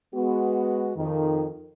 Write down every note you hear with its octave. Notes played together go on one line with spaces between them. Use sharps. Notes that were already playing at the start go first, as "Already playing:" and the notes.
G#3 B3 F#4
F2 D#3